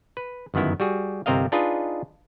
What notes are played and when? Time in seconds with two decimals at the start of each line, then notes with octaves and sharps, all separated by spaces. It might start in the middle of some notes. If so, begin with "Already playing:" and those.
0.17 B4
0.54 G1 F#2 D#3 B3 E4
0.80 G3 F#4 G#4
1.26 G1 C3 C4 A#4 D#5 F5
1.52 D4 D#4 F4 G#4 B4 D#5